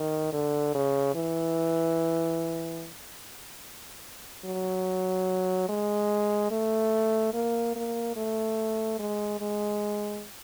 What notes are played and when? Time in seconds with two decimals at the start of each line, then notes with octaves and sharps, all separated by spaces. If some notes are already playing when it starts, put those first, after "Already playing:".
Already playing: D#3
0.33 D3
0.75 C#3
1.15 E3
4.45 F#3
5.69 G#3
6.51 A3
7.34 A#3
7.76 A#3
8.16 A3
8.99 G#3
9.41 G#3